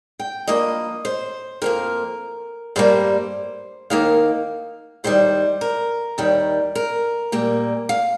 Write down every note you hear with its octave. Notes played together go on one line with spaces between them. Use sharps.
G5
G2 F3 A#3 D#5
C5
F2 F3 A#3 A#4
G2 G3 A#3 C5
D#2 D#3 A#3 F5
D#2 D#3 G3 C5
A#4
D#2 D#3 G3
A#4
A#2 G3 A#3
F5